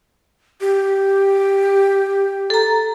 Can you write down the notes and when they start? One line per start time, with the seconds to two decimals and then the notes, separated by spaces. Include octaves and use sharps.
0.61 G4
2.50 A4 A#5